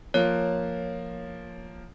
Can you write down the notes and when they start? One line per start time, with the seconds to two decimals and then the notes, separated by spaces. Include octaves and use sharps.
0.14 F3 A#3 C#5